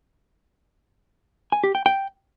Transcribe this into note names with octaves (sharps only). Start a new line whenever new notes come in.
G#5
G4
G5
G5